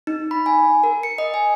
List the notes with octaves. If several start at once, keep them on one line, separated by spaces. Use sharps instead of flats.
D#4
B5
G#5
A#4
C#7
D#5
G#5